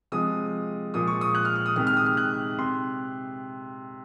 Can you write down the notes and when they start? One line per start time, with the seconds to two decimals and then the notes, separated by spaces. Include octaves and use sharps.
0.12 C3 F3 G#3 D#6
0.94 A#2 F3 G#3 D#6
1.07 C#6
1.21 D#6
1.35 F#6
1.45 F6
1.56 F6
1.66 D#6
1.76 C3 D#3 G#3 F6
1.87 F6
1.97 D#6
2.06 F6
2.17 F#6
2.58 C3 C6